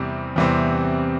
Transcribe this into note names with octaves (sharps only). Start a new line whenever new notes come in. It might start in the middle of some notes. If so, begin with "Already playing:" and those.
Already playing: E2 C3 E3 G3 C4
E2 C3 E3 G3 C4